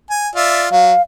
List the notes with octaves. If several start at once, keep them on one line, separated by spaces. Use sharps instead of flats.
G#5
F4 D5 E5
F#3 F5